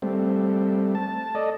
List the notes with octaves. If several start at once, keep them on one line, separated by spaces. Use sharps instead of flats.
G3 A3 C4
A5
A4 D5 D#5